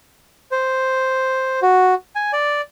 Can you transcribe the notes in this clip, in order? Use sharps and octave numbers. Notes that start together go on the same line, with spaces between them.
C5
F#4
G#5
D5